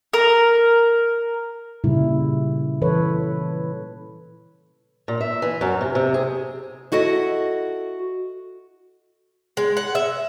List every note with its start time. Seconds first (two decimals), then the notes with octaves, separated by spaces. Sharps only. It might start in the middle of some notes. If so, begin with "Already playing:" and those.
0.13 A#4
1.84 A#2 C#3 G3 E4
2.81 E3 A4 B4 C#5
5.08 A#2
5.21 E5
5.42 E3
5.61 F#2
5.81 C3
5.95 C3
6.14 G#4
6.92 E4 F#4 A4 D#5
9.57 G#3
9.77 F#5
9.95 E5